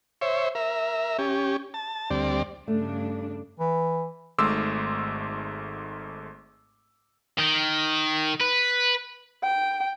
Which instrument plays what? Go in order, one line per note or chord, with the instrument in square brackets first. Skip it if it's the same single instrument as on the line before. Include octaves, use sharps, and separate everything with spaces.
[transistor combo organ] C5 C#5 E5
A#4 E5
C#4 G4
A5
D2 G3 C4 D5
[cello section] G2 C#3 D4 [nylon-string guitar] A3
[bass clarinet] E3
[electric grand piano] G#1 G#2 A3 C6 D6 E6
[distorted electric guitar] D#3
B4
[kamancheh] G5